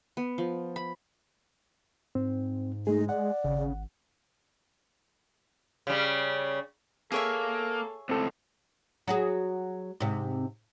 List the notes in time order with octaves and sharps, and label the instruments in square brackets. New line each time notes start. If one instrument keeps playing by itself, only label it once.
[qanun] B3
F3
B5
[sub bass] G#2 [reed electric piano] C4
[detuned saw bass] G#3 [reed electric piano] A3 G#4 [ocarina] D#4
[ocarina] D5 [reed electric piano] F#5
[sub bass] G#1 [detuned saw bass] C#3
[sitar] C#3 G3
[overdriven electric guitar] A#3 [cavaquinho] G#4 C#5 E5 [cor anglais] A4
[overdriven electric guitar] C#2 A2 [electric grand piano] C4 A4
[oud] F#3 F#4 G#4
G#2 C3